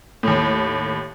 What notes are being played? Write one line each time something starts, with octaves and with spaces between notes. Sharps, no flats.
D#2 A2